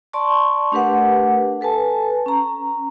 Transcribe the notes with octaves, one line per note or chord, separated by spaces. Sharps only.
D5 A5 C6 C#6
A3 D4 G4 A#4 B4 F#5
A4 B4 G#5 A5
C#4 A#5